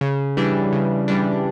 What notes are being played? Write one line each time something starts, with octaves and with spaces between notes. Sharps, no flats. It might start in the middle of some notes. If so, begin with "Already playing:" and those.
C#3
E3 G3 D4
C#3
E3 G3 D4